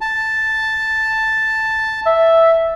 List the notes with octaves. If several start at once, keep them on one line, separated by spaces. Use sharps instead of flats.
A5
E5